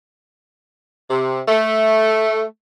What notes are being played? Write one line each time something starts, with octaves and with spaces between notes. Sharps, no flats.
C3
A3